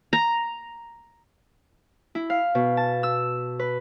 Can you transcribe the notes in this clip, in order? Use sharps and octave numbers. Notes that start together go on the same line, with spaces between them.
A#5
E4
F5
B2
A5
E6
B4